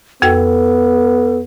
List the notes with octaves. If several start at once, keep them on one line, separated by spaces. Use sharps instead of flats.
F2 B3 F#4 A4 G5